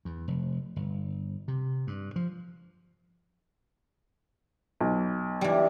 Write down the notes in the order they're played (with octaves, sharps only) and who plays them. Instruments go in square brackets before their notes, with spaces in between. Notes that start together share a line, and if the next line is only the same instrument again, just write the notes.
[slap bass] E2
F1
G1
C3
G2
F3
[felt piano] B1
[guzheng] E3 G3